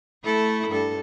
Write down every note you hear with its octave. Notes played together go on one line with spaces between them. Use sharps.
A3 E4 A4
G2 A4